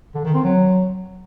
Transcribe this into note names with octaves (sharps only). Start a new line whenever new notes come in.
D3
D#3
C4
F#3